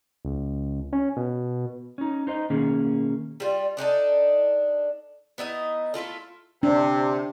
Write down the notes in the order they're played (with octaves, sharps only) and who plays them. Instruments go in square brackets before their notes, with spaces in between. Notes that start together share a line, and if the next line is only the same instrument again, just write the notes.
[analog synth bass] C#2
C#4
B2
[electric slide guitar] C#4 D#4
D#4 C5 D#5
B2 D#3 A#3 C#4 G#4
[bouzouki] G3 F4
D4 D#4 G4 A4
B3 D#4 E4 D#5
A3 E4 F4 A4
[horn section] C3 [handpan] D4